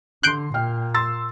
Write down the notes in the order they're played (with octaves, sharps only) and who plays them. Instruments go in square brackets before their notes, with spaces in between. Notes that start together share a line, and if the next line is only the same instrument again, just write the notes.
[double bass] D3 [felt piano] C6 C7 [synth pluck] F#6 G6 D7
[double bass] A#2 [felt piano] G5 F6
[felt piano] C6 E6 A6